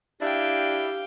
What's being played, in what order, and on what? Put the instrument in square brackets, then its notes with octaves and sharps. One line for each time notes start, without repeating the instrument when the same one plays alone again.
[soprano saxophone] D4 [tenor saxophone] E4 [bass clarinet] G4 [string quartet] F5 G5